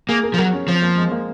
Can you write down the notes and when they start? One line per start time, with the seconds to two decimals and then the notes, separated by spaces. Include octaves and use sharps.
0.08 A#3 G#4
0.24 A#4
0.34 F3
0.38 F#3 A#4
0.53 C#4
0.68 F3 C4
0.82 A#3
0.97 G#3
1.11 A#3